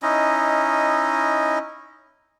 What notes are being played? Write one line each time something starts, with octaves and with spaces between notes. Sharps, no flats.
C#4 D#4 E4 D#5